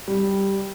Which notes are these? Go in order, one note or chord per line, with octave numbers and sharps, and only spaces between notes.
G3